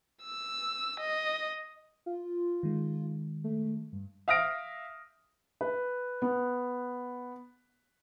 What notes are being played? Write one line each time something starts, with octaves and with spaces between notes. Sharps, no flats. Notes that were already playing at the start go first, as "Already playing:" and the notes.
E6
D#5
F4
D#3 G#3
A3
G2
E5 F5 D#6 F6 A#6 D7
B4
B3